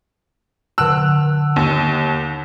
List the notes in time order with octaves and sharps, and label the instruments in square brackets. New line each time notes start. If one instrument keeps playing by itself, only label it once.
[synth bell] D3 F#5 A5 [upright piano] E6 F#6
[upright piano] D#2